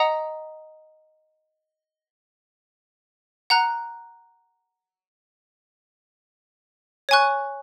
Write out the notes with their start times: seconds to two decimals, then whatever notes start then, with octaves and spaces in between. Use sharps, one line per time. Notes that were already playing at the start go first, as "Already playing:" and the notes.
Already playing: D#5 F#5 A#5 D#6
3.50 F#5 A#5 F#6
7.09 C#5 G#5 C#6 F#6